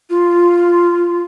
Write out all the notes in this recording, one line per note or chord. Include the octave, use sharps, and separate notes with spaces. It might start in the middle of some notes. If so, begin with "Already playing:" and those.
F4